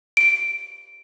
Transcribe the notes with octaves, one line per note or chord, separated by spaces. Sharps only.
D7